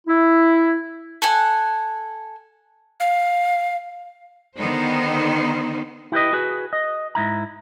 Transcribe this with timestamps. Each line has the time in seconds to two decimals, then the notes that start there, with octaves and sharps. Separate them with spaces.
0.07 E4
1.22 A4 F#5 G#5
3.00 F5
4.57 D3 D#3 B3 D#4 C5
6.12 E4 G4 B4 D#5
6.33 F#4 G#4 B4
6.73 D#5
7.15 G#2 E4 A#5